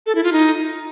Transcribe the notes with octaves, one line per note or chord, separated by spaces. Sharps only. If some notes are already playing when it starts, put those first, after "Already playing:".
A4
E4
F4
D#4